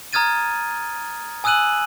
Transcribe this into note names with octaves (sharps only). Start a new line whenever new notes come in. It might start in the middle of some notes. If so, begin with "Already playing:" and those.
A#5 D#6 F6 G#6 A6 D#7
G#5 D#6 E6 F#6 D#7 F#7